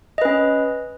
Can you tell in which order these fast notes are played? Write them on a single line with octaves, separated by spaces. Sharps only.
D#5 B4 C#4